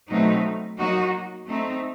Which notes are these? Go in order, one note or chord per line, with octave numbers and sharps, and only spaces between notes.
B2 F#3 A3 C4 D#4
F#3 A#3 D#4 F#4
A3 C4 D#4